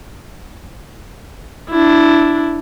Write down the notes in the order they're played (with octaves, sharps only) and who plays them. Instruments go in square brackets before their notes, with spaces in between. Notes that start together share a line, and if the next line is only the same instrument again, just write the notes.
[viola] D4 E4